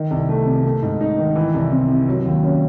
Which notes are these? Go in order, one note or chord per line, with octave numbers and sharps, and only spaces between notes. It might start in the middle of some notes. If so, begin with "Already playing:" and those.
Already playing: D#3
C2
A3
C3
A3
G#2
D#4
D#3
E3
C2
C4
C3
F#3
D#2
C#4